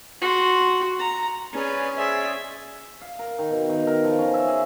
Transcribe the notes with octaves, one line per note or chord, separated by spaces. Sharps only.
F#4 C6
A#5
C#4 G#4 B4 D5
G#4 C5 D5 E5
F5
A#4
D#3
B2
D#3
A#4
F3
C#4
E5
G#4